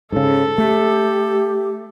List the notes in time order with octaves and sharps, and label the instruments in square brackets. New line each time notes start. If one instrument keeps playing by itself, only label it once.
[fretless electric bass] G#2 C#3 [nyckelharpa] A4
[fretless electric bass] A3 [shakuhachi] G4